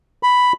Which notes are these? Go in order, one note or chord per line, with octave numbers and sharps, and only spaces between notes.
B5